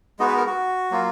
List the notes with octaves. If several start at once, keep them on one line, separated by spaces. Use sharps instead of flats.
G#3 B3 D#4 F#4 D#5
B4
A#4
F#4
F#3 A#3 F4